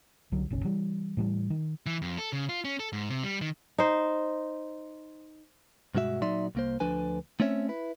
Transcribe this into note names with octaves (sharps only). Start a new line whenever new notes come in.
C2 D3 F#3
F#1 B1 C#4
E3 G3
A2 E3 G3
D#3
E3
F2
A4
C#3
F4
C#4
A4
G#2
C3
G3
D#3
D#4 C5
G2 B2 G#3 F#4 E5
A#2 F#3 D#4 D5 E5 C6
C2 A#3 C5
D2 D3 F3 D4 B4 G#5
A3 C4 C#4 C#5 E5
E4 B4